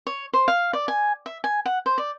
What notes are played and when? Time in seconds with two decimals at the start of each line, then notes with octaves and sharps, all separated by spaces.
0.07 C#5
0.33 C5
0.48 F5
0.73 D5
0.88 G#5
1.26 E5
1.44 G#5
1.66 F#5
1.86 C5
1.98 D5